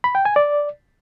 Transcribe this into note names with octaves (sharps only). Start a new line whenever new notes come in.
B5
G5
G#5
D5